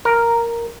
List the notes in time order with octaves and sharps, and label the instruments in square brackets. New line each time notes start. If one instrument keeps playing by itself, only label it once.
[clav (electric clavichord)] A#4